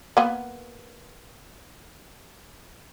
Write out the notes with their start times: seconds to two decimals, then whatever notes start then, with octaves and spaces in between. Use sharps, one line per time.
0.17 A#3 B3